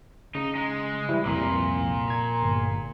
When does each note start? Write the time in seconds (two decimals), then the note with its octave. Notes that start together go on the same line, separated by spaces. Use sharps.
0.35 C#3 D#4
0.55 G#3
1.09 E3 G3 E4
1.26 C2 F2 A#2
2.08 A#5 G#6
2.42 G1